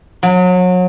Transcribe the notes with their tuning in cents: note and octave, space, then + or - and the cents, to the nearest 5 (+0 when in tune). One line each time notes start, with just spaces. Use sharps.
F#3 -30